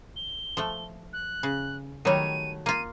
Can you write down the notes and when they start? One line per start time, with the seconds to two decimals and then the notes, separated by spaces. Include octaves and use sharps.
0.16 G7
0.57 F3 A3
1.13 F#6
1.43 C#3
2.05 D#3 F#3 G3 A3 C#5 D#7
2.66 A#3 F4 D#7